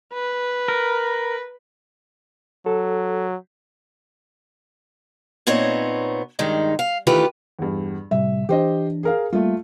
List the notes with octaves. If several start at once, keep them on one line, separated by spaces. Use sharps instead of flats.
B4
A#4
F#3 A4
A#2 B3 C4 D#4 C#5
G2 D#3 G#3 D#4
F5
D#3 E3 A3 F4 G4 B4
E2 G2
A2 C3 G3 E5
E3 D4 G4 C5 D#5
G#4 A#4 F5
G3 A3 A#3 F4